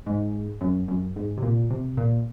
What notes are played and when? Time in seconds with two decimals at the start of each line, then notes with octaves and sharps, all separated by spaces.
0.06 G#2
0.61 F#2
0.88 F#2
1.16 G#2
1.37 C3
1.42 A#2
1.70 C3
1.97 A#2